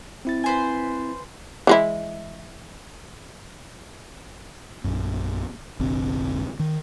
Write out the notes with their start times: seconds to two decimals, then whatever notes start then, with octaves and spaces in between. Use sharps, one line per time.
0.25 C4 E4 A6
0.44 B4 C5 G#5
1.67 E3 G#3 E4
4.84 A#1 F#2
5.80 F1 A#1 D3 C4
6.60 D#3